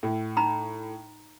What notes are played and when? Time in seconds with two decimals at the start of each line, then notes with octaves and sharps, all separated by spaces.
0.03 A2
0.37 D#4 A#5 B5